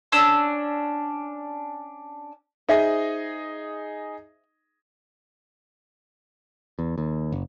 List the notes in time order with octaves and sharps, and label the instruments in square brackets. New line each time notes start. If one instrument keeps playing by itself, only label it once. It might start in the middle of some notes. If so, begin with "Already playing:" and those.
[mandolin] C#4 D4 E6
[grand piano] D#4 G#4 D#5 [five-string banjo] C5 E5
[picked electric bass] E2
D#2
F#1